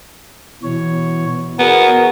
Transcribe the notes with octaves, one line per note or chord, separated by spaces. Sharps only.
B2 E3 C#5
B3 F#4 G#4 A#4